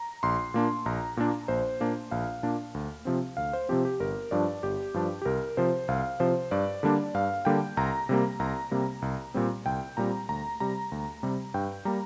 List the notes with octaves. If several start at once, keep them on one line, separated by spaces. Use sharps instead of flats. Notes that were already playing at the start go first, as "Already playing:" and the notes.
Already playing: A#5
A#1 C6
A#2 A#3 D4
A#1 A#5
A#2 A#3 D4
A#1 C5
A#2 A#3 D4
A#1 F5
A#2 A#3 D4
D2
C3 F3 C4
D2 F5
C5
C3 F3 C4 G4
G4
G1 A#4
G2 F3 D4 D5
G1 G4
G2 F3 D4
G4
C2 A#4
C3 F3 C5
C2 F5
C3 F3 C5
G2 D5
D3 G3 A#3 D4
G2 F5
D3 G3 A#3 D4 G5
C2 A#5
C3 G3 A#3
C2 A#5
C3 G3 A#3
C2
A#2 G3 C4
C2 G5
A#2 G3 C4 A#5
D2 A#5
C3 G3 A#5
D2
C3 G3
G2 G5
G3 A#3 A#5